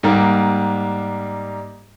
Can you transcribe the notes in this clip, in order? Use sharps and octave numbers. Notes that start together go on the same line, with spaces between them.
G#2 G3 A#3